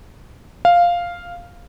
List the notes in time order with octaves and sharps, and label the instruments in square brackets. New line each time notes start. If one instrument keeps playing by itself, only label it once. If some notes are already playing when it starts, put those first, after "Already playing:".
[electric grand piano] F5